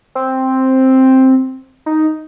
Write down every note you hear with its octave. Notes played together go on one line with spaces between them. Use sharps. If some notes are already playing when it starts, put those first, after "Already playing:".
C4
D#4